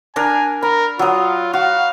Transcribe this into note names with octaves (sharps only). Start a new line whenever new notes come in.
D4 A#4 G#5 A#5
A#4 B5
F#3 F4 D#6
F#4 F5